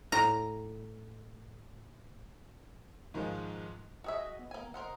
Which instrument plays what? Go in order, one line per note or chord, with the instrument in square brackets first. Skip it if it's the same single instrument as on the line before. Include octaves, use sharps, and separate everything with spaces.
[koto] A2 A#5
[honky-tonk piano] G#2 D#3 F3 G#3 F4
[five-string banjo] F#4 G#4 E5 [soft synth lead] D#5
[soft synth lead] D#5
B3
[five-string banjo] A#3 G#5
[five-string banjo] A#4 C5 F#5 [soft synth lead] D#5